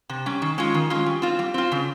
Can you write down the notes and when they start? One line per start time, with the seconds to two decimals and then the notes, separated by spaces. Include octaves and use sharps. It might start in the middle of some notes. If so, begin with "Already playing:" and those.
0.09 C3
0.26 G3 C#4
0.42 D#3
0.58 G#3 C#4 F4
0.74 D#3
0.90 G#3 C#4 F4
1.06 G3
1.22 C4 F4
1.39 G3
1.54 C4 F4
1.72 C#3